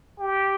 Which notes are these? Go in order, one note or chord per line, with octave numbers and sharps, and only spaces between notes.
G4